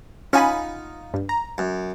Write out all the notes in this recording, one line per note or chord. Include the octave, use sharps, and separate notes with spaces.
C#4 D#4 F4 F#5 G#5 B5
G2
A#5
F#2